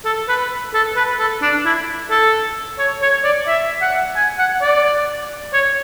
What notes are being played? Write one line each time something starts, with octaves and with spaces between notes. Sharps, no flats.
A4
B4
A4
B4
A4
D4
E4
A4
C#5
C#5
D5
E5
F#5
G#5
F#5
D5
C#5